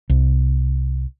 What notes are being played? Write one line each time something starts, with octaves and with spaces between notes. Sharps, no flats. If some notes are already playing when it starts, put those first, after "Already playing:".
C2